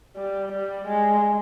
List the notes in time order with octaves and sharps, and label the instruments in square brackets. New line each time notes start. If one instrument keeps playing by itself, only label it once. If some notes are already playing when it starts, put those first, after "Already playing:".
[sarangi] G3
G3
G#3